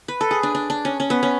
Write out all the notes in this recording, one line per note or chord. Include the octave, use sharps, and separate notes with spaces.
B4
A4
G#4
D4
D4
D4
C#4
C#4
B3
C#4